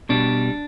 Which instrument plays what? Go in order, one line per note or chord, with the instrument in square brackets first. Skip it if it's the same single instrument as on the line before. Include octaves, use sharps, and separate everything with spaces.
[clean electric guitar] B2 G3 D4